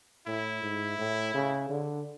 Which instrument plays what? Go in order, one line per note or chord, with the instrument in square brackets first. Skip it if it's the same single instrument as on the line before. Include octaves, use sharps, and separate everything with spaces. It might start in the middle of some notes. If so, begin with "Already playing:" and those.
[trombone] A2 [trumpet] E4
[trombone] G#2
A2
C#3
D3